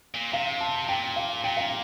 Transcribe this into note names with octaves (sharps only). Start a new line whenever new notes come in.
A#2
C3 F5
A5
A#2 G5
F5
A#2 G5
F5